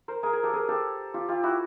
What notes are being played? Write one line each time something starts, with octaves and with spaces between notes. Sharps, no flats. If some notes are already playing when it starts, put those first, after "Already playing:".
A#4 C5
G#4 A#4
G#4 A#4
G4 A4
G#4 A#4
G4 A4
F4 G4
F4 G4
E4 F#4